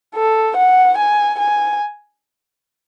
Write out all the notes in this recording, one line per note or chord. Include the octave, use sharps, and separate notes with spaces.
A4
F#5
G#5
G#5